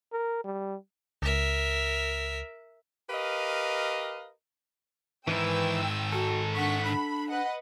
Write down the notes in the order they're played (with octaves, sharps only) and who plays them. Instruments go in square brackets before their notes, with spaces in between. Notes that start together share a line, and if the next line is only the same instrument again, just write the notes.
[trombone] A#4
G3
[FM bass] C#2 [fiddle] A#4 E5
[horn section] G4 A#4 B4 D#5 F5
[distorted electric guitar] G#2 D#3 [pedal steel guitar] E3 E4 [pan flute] B4 [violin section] G5 E6
[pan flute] F#4 [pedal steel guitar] A4
[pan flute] D4 [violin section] F#5 C#6 B6
[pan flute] D4 [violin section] B5
[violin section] B4 D#5 F#5